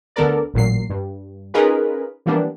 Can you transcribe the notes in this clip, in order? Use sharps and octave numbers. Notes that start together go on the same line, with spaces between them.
D2 D3 B3 A4 A#4 D5
A1 A#2 F#3 C7
G2
C#4 D#4 F4 G#4 A#4 B4
E3 F3 G3 A#3 B3 D4